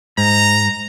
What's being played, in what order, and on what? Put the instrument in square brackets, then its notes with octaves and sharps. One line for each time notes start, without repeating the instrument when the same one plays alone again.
[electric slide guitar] G#2 [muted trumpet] A#5